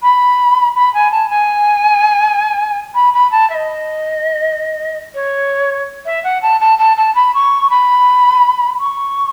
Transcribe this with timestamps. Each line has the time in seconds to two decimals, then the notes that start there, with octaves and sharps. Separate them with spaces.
0.02 B5
0.76 B5
0.94 G#5
1.12 A5
1.30 G#5
2.95 B5
3.13 B5
3.31 A5
3.50 E5
3.54 D#5
5.14 C#5
6.06 E5
6.24 F#5
6.42 A5
6.60 A5
6.78 A5
6.97 A5
7.15 B5
7.34 C#6
7.70 B5
8.79 C#6